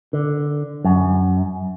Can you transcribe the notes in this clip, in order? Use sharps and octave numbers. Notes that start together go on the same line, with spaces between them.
D3
F#2